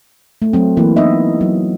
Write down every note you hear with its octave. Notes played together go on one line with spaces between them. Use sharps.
A3
F#3 C4
E3 A#3 B4
B3 D#4 E4 D#5 E5
F#3